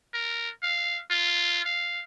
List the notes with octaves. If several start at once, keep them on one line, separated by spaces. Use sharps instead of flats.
A#4
F5
F4
F5